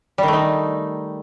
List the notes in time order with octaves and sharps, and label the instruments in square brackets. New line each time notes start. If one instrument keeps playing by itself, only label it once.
[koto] G3
D#3
A3
D#4